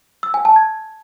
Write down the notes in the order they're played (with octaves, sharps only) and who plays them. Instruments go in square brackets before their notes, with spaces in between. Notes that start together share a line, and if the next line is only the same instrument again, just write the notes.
[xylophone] E6
G#5
A5
G#6